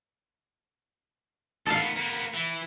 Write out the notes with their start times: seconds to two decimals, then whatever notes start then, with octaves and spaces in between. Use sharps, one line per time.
1.66 D#3 B3 A4 F5
1.96 A#3 B3
2.34 E3